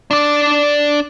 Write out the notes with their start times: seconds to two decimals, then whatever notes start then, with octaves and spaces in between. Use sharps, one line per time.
0.11 D4 D5